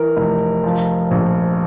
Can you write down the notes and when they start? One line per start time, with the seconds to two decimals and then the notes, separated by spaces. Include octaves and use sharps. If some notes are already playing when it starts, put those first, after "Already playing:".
Already playing: E3 A#4
0.17 F1
0.64 F3
1.11 A#1